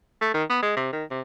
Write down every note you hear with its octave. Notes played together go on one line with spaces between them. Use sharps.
A3
D#3
B3
G#3
C3
D#3
C3